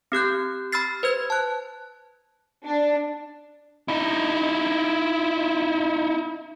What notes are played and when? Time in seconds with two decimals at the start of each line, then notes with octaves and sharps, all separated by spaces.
0.12 C4 G4 F#6 G6
0.72 B5 E6 F6 A6 C7
1.03 B4 C5 G#6
1.30 A5 F#6
2.66 D4
3.88 D#4 E4